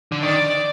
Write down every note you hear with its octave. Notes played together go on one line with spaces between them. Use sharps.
D3
D#3 D5